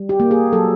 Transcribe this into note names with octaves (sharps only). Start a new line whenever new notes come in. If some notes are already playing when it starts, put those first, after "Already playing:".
Already playing: G3
G4
A#3
G#4
F#3 A4